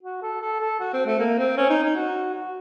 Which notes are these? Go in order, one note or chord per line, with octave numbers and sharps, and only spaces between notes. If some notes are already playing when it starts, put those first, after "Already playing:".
F#4
A4
A4
A4
F#4
C4
A3
A#3
C4
C#4
D#4
D#4
F#4
F#4